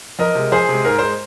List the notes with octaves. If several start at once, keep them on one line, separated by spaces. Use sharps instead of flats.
F2 A#4 D#5
C3 G#3
F2 G#4 C5
C3 G#3
G#2 A#4
G#3 C5